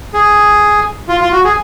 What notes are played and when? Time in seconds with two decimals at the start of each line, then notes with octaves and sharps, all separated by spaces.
0.14 G#4
1.09 F4
1.21 F4
1.32 F#4
1.44 G#4